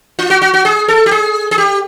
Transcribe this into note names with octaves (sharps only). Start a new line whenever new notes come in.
F4
F#4
F#4
F#4
G#4
A4
G4
G#4
G#4
G4